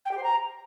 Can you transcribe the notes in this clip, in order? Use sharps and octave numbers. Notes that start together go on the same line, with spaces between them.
G5
G4
C5
A#5